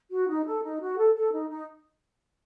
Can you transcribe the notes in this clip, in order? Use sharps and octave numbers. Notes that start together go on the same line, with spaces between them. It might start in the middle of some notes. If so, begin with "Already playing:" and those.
F#4
D#4
A4
D#4
F#4
A4
A4
D#4
D#4